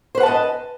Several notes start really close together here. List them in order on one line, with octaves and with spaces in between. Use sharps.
C5 B4 F#5 A5 D#5